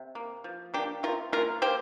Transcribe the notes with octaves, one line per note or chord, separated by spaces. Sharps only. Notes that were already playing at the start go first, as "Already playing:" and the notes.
Already playing: C3
A#3
F3
A#3 D4 G4
C3 F4 A#4
A#3 F4 A#4
A#3 G4 C5